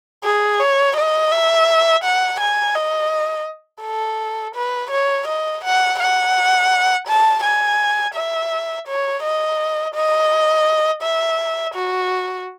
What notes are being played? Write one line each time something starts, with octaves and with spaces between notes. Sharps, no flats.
G#4
C#5
D#5
E5
F#5
G#5
D#5
A4
B4
C#5
D#5
F#5
F#5
A5
G#5
E5
C#5
D#5
D#5
E5
F#4